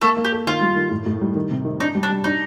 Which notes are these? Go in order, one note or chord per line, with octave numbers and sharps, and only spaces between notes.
A3 A#3 A4
A#3
G4
A4
D#3 F4
G3
D#3
A2
A2
G3
D#3
C3
D#3
D4 D#4
G3
D4
G3
D4 D#4